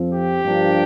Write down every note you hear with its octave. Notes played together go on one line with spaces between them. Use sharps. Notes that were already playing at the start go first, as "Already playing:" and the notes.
Already playing: F2 F3 C4
G4
G2 F3 A#3 D4